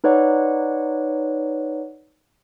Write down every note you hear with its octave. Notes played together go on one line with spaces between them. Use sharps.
D#4 B4 C#5 D5 F#5